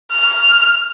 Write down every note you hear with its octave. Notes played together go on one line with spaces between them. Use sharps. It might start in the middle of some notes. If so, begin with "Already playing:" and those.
F6